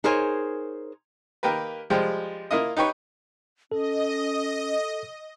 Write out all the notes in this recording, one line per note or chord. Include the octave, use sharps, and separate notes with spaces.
D#4 G#4 A#4 C5 C#5 G#5
D#3 A#3 G4 A#4 B4
F3 G3 G#3 G4
A#3 E4 F4 D#5
D#4 G4 B4 C#5
C#4 A4 D#5